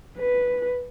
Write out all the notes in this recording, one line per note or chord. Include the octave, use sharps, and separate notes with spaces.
B4